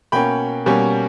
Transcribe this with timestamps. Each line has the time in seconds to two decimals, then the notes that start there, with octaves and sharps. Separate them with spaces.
0.12 B2 A#3 C#4 G5 B5
0.66 B2 G3 A#3 C#4